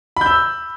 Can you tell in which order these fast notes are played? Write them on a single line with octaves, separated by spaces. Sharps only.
B5 G6 E6